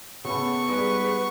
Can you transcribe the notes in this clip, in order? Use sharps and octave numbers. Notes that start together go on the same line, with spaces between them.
C#3 A3 B3 C#6
G3 G#3 D#4 B4